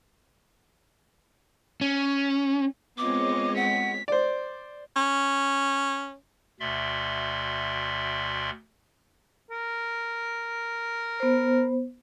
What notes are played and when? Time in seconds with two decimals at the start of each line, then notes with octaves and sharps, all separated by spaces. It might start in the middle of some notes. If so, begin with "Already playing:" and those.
1.81 C#4
2.98 G#3 B3 C4 F4 C#5 D#5 D6
3.56 F#5 B6
4.08 C5 D5
4.96 C#4
6.60 D2 B2 D5 E5 C6
9.50 A#4
11.20 B3 C5